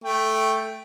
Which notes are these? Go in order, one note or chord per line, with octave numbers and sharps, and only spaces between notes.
A3 G5